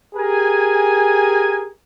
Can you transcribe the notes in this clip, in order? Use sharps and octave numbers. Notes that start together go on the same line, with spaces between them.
G4 G#4 A#4 G#5